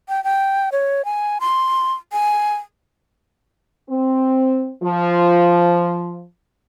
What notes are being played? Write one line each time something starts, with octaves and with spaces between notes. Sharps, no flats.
G5
G5
C#5
G#5
C6
G#5
C4
F3